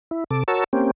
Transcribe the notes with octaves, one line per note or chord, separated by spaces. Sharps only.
E4
C3 A4 D6
F#4 A#4 C#5 A5 E6
A#3 C4 C#4 G4